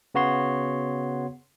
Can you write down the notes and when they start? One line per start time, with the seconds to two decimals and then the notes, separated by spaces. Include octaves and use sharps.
0.15 C#3 B3 F#4 C#5 C6